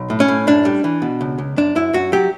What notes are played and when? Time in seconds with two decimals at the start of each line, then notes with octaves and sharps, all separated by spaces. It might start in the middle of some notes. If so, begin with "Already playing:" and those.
Already playing: B1
0.10 A2
0.20 C#4
0.28 A2
0.47 F#2 D4
0.65 G3
0.84 E3
1.02 B2
1.21 C#2
1.38 C#2
1.57 F#2 D4
1.75 F#2 E4
1.93 F#2 F#4
2.12 F#3 G4